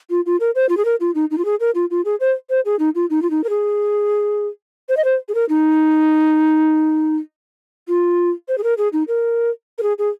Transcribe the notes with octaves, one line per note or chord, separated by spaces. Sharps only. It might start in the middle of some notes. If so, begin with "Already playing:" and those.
F4
F4
A#4
C5
F4
G#4
A#4
F4
D#4
D#4
F4
G#4
A#4
F4
F4
G#4
C5
C5
G#4
D#4
F4
D#4
F4
D#4
A#4
G#4
C5
D#5
C5
G#4
A#4
D#4
F4
C5
G#4
A#4
G#4
D#4
A#4
A#4
G#4
G#4